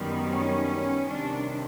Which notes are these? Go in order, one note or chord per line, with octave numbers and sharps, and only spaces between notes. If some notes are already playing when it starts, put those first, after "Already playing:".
Already playing: F#2 D#3 G3 B3
C#4
C3 D#3 G3 D4